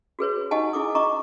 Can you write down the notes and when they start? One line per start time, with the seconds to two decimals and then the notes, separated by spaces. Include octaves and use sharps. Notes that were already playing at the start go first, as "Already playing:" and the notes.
0.19 F#4 G#4 B4 C#5
0.51 D#4 G4 D#5 F#5 G#5 A5
0.73 E4 G#4 D6 D#6
0.95 D#5 A#5 C#6 D6